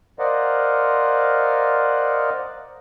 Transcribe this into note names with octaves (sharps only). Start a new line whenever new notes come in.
A#4 C5 D5 D#5 F5 F#5